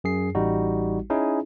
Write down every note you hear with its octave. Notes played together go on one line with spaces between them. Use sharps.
F#2 G#4 C7
A1 G3 D#4 F#4
C#4 D#4 E4 G#4